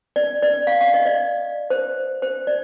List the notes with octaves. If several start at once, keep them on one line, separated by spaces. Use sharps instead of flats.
D5
D5
F5
F5
D#5
D5
C5
C5
D5